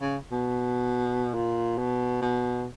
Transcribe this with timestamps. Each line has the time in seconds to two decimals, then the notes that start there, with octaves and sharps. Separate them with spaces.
0.01 C#3
0.31 B2
1.34 A#2
1.78 B2
2.22 B2